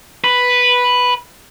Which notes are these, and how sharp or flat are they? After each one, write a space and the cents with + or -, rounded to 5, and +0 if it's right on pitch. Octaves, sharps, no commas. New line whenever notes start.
B4 +0